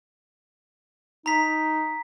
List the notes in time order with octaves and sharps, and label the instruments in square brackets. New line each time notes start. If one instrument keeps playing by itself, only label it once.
[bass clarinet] D#4 [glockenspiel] A#5 B6